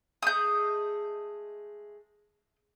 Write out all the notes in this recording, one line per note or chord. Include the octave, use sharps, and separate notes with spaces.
G#3 A3 D#6 G6